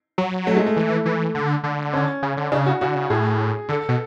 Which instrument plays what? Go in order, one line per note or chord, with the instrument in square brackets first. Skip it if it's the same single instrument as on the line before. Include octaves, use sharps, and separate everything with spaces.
[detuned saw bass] F#3
[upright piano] A3
G#3
A3
[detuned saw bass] E3
E3
D3
D3
[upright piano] C#4
[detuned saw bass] C#3
D3
[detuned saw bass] C#3 [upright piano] D4
[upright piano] F#4
[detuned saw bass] C#3 [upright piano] F#4
[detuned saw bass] D3
C#3
[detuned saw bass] A2 [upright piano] G#4
[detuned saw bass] D3 [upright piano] A4
[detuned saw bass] B2